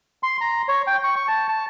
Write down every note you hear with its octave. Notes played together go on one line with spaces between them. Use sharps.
C6
A#5
C#5
G5
C#6
C#6
A5
A5